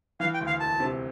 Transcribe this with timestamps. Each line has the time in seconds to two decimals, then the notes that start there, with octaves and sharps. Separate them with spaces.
0.20 E3 F5
0.34 G5
0.41 D2
0.47 F5
0.60 E1 A5
0.80 C3